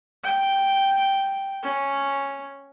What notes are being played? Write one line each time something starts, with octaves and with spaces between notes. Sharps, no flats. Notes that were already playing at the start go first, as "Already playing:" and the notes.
G5
C#4